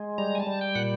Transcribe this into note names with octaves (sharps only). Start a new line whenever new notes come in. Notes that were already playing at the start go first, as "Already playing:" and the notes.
Already playing: G#3
G3 A#5
G#5
A5
G3
G5
A#2 F#5